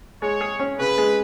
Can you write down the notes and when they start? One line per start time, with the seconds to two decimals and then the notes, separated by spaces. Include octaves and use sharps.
0.22 G#3 C#5
0.41 G#4
0.60 C#4
0.78 C#3 B4
0.98 G#3